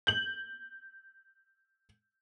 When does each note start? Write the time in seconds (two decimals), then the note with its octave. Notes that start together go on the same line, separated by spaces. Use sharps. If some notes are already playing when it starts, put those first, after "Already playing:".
0.07 G6 F#7